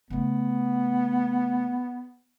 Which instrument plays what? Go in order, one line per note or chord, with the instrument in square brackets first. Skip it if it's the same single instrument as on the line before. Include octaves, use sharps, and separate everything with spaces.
[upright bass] C#3 A3 [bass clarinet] B3